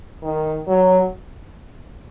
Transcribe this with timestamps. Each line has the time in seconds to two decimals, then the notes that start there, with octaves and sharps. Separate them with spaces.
0.24 D#3
0.68 F#3